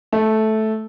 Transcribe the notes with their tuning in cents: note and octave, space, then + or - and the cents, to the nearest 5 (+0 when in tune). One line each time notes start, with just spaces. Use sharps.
A3 -10